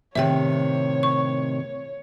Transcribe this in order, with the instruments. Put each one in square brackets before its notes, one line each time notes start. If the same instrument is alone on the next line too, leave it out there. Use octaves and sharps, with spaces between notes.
[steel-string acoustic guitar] A2 C3 D#3 [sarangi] C#5 [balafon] E5 G5
[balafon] C#6